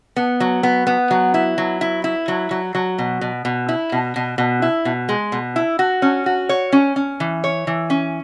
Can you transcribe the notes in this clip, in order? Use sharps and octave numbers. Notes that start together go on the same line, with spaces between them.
B3
F#3
B3
B3
F#3
E4
F#3
E4
E4
F#3
F#3
F#3
B2
B2
B2
E4
B2
B2
B2
E4
B2
G#3
B2
E4
F#4
C#4
F#4
C#5
C#4
C#4
E3
C#5
E3
C#4